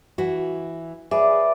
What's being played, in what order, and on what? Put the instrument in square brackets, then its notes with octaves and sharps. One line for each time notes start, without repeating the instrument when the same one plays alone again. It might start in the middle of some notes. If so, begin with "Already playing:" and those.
[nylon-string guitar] E3 E4 F#4
[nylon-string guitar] G#4 [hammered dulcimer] B4 D5 [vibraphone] E5